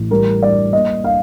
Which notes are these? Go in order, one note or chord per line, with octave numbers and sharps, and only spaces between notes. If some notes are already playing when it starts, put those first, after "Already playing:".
Already playing: A1
G3 A#4
G3 D5
A#3 D#5
F5